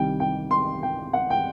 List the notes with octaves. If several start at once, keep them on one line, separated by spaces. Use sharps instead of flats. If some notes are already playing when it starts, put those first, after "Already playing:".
Already playing: C2 C3 D#3 G3 G5
G5
C6
G5
F#5
G5